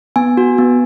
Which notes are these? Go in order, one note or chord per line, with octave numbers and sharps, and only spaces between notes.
B3 G#5
F#4
B3